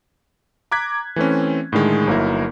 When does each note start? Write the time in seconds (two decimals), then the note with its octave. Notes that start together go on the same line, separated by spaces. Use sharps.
0.71 A#5 D6 F#6 G#6 B6
1.16 E3 A3 C4 C#4
1.72 A2 D3 D#3 G#3
2.07 G1 F#3 A#3 D#4 E4 A#4